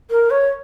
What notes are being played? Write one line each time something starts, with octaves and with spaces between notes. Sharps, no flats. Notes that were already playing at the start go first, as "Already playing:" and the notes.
A#4
C#5